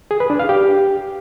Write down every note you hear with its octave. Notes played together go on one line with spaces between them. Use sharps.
G#4
B4
D4
F5
G4